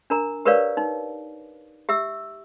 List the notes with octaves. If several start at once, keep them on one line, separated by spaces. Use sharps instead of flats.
D4 A#4 A#5
G4 A#4 B4 C#5 D5 F5
D#4
G4 E5 E6